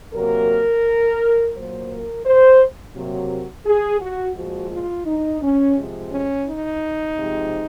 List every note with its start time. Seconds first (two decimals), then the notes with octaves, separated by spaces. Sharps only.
0.15 C3 F#3 A#3 A#4
1.55 A#2 F#3 A#3 C5
1.91 A#4
2.26 C5
2.95 C3 F#3 A#3
3.66 G#4
4.00 F#4
4.36 A#2 F3 G#3 F#4
4.71 F4
5.06 D#4
5.42 C#4
5.77 C3 F3 G#3
6.12 C#4
6.46 D#4
7.17 C3 F3 G#3